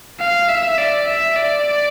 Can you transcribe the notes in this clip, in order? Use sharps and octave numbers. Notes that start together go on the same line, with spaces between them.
F5
E5
D5
E5
D5